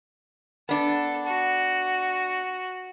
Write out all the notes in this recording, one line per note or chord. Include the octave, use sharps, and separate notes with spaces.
B3 D4 A4
F#4